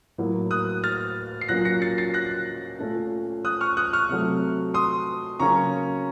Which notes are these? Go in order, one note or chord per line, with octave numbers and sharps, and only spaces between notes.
A2 F#3 A#3
D#6 F#6
F6 A6
C7
A#2 F#3 A#3 C#4 F#6 A#6
A#6 C#7
A6 C7
A6 C7
F#6 A#6
A#2 A3 C#4
D#6 F#6
C#6 F6
D#6 F#6
C#6 F6
C3 F#3 A3
C6 D#6
C#3 F#3 A#3 C#4 A#5 C#6